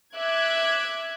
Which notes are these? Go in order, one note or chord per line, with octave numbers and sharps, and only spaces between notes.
E5 D6 F#6 G#6